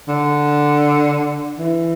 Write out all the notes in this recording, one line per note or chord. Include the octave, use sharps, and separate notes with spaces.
D3
E3